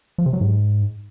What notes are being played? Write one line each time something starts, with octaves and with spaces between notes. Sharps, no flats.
F3
C3
F#3
G#2